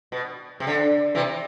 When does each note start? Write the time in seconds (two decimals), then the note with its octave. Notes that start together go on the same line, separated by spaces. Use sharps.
0.12 B2
0.60 C3
0.67 D3
1.15 C3 E3